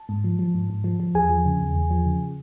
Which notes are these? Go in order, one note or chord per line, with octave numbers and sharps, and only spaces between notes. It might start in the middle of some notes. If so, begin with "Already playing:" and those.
Already playing: A5
G#2
F3
F3
G#2
G#2
F3
F3
E2 G#4 G#5
F3
C#3
E2
E2
F3
C#3